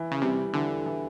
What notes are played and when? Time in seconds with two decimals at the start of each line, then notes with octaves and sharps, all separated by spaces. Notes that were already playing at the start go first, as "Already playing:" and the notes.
Already playing: E3
0.11 C#3
0.22 C3 G3
0.53 D3 E3
0.86 E3